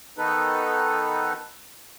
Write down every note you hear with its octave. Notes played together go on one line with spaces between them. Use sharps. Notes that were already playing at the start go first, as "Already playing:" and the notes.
D#3 B3 D#4 A4 B4